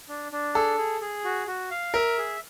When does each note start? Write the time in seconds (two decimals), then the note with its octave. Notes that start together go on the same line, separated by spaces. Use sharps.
0.09 D4
0.32 D4
0.55 G#4 A4
0.78 G#4
1.01 G#4
1.24 F#4
1.47 F#4
1.71 F5
1.94 A#4 E5
2.18 G#4